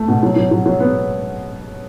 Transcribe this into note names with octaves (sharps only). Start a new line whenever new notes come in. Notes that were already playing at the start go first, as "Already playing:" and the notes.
Already playing: A3
B2
F#3
F#3
F#3
F#3
B3